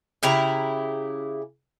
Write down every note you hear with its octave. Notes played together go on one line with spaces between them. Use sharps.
C#3 E4 G4 A#5